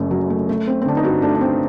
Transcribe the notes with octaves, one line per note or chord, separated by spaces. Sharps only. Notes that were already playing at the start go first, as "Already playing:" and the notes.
Already playing: F#1 F#2 A3
F#3
A3
A3
C4
C4
D3 D4
D#4
G2 F#4
A3 D4
D4
C4